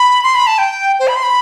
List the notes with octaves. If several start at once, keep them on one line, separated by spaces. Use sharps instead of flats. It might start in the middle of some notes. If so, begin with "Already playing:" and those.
Already playing: B5
C6
B5
A5
G5
C5
B5
C6
B5